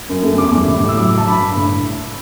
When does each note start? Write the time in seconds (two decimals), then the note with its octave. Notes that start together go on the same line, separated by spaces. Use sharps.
0.09 F#2
0.23 A3
0.38 E2 D6
0.54 G3
0.68 A2
0.83 A2
0.89 E6
0.97 F#3 D6
1.12 F#3
1.18 A5
1.27 G2 B5
1.42 G2
1.57 A2